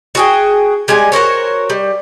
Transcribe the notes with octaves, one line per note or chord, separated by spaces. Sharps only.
F#4 G#4 G5
G3 G#3 F#5 G#5
F#4 A#4 C5 C#5
G3